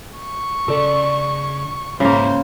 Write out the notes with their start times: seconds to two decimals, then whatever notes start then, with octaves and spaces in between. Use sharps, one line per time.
0.18 C#6
0.68 C#3 A4 D5 C6
2.00 G#2 C#3 A#3 E4 C5